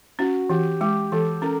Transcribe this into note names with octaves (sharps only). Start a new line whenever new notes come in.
C#4 F#4
E3 G4
G#3 G4
E3 A4
C#4 A#4